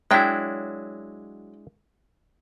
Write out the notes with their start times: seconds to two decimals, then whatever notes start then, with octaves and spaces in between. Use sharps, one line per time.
0.11 F#3 G#3 D4 E4 G5